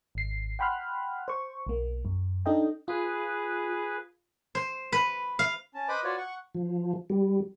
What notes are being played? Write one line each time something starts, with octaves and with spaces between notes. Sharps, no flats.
G#1 C7
F#5 G5 B5 C6 F6 F#6
C5 C#6
B1 A#3
F#2
D4 D#4 A4 D#5 G5
F4 G#4 B4
C5
B4
F5
C#4 A5
B4 C5 D#5 B5 D6 D#6
F4 F#4 B4 C#5 D5
F#5 C#6
F3
G3